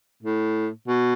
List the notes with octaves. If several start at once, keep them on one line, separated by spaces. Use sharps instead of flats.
A2
B2